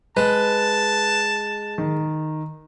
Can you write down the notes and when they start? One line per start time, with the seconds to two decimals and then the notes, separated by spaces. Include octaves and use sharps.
0.17 G#3 B4 A5
1.78 D#3